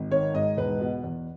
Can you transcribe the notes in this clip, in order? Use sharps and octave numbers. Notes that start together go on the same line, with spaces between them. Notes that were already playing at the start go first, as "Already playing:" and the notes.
Already playing: G#1
D#3 C#5
G#2 D#5
E1 B4
B2
E2